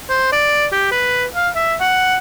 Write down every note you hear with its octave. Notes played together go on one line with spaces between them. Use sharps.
C5
D5
G4
B4
F5
E5
F#5